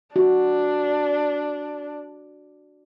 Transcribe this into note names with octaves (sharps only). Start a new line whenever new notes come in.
D4 F#4